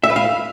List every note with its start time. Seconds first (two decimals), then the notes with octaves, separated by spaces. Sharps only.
0.04 E5
0.10 B4
0.16 F5